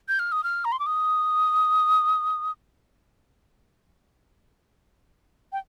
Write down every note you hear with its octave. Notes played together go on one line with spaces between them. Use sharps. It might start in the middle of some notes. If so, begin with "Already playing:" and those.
G6
F6
D#6
F6
A#5
C6
D6
D#6
G5